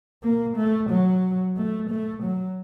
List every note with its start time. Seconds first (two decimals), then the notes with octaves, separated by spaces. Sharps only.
0.23 A#3
0.57 A3
0.90 F#3
1.57 A3
1.90 A3
2.23 F#3